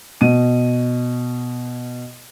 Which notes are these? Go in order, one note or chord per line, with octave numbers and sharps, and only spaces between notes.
B2 D#7